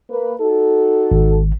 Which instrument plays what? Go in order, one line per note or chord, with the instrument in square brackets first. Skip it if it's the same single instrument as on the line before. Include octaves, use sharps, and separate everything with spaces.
[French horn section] A#3 B4
D#4 F#4 A4
[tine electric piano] G#1